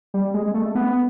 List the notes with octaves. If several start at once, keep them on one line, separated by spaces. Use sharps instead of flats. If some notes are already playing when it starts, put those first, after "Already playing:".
G3
G#3
A3
B3